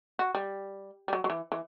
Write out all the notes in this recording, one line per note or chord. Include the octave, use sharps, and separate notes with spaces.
F#4
G3
G3
F#3
F#3
E3
E3